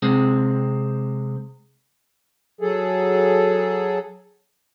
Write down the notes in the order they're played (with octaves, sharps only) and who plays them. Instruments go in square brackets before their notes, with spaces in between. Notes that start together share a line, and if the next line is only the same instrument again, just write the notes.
[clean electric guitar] C3 G#3 C4
[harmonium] F#3 G#4 A4